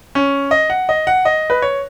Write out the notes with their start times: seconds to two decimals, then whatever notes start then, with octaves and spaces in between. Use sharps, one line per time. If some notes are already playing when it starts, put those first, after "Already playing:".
0.15 C#4
0.51 D#5
0.70 F#5
0.89 D#5
1.07 F#5
1.25 D#5
1.50 B4
1.62 C#5